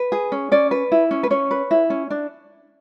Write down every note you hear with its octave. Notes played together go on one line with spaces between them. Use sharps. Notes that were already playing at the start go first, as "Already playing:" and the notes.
Already playing: B4
G#4
C#4
C#4 D5
B4
E4
C#4
B4
C#4 C#5
B4
E4
C#4
D4